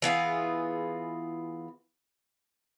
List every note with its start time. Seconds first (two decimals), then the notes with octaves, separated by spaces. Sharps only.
0.02 E3 B3 F4 G#4